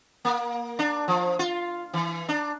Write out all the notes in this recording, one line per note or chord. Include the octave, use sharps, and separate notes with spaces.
A#3
D4
F3
F4
E3
D4